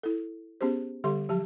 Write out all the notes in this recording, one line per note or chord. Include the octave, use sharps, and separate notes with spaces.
E4 A4
B3 C#4 G4 G#4 C5
D3 G3 G4 A4 E5 C6
F3 F#3 G4 A5